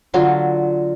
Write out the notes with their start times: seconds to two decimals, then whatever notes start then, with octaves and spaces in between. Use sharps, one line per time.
0.14 D3 F#3 F4 C6